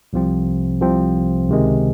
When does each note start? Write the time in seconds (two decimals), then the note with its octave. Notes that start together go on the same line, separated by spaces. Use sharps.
0.13 C2 C3 F3 C4
0.81 C2 C3 F3 C4
1.49 C#2 C3 D#3 G#3